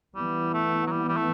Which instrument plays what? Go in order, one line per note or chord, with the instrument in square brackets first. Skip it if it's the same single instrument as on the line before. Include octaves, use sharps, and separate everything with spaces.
[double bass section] E3 B3 [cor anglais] G3
[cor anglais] A3
F#3
G3
G3
A3